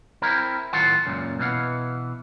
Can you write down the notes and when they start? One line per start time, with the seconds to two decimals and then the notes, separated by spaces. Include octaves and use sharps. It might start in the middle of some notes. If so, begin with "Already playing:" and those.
0.22 C4 E4 A#4
0.73 A2 D#3 F#3 F4 F#5 C6
1.06 C#2 F#2 A#2
1.39 B2 E3 F5 F#5